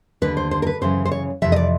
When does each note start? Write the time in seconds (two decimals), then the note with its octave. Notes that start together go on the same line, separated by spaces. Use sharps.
0.22 D#2 D3 B4
0.37 C5
0.51 C5
0.62 A#4
0.67 B4
0.81 F#2 C#3 E3 C5
1.05 C5
1.12 C#5
1.42 F2 C3 E3 E5
1.52 D#5
1.56 D5